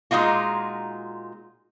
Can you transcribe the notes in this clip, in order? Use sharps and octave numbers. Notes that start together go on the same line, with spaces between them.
A#2 G#3 D#4 F4 F#4